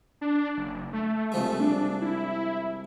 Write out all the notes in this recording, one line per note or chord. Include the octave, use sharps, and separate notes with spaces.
D4
F#1
A3
C2 F3 G#3
D4
E4